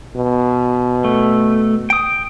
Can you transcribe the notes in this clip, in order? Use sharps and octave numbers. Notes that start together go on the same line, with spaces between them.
B2
A3
G5 D#6